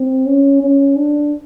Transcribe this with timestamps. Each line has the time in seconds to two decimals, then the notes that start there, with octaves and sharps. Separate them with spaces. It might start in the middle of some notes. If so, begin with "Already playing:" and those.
Already playing: C4
0.26 C#4
0.62 C#4
0.97 D4